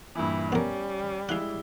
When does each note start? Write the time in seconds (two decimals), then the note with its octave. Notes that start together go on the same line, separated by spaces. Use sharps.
0.15 G2 A#2 E3 E4
0.52 G3 B3 C#4 A#4
1.29 G#3 E4 F5 F#5 G7